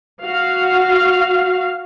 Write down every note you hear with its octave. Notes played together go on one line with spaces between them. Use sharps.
F#4 F5